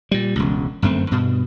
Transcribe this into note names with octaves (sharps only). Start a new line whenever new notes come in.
A#2 G3
E1 C#2
G1 F#2 A3 C4
G2 B2